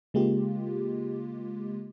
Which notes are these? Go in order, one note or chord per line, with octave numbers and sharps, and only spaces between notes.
C#3 G#3 A#3 F4 G4